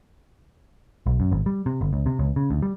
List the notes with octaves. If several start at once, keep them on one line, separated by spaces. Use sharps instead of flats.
B1
F#2
G#1
G3
C3
G1
C#2
C3
C#2
C#3
D2
G3